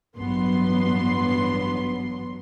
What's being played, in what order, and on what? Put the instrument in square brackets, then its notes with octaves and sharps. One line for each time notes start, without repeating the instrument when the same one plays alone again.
[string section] A1 G2 F#3 B3 C6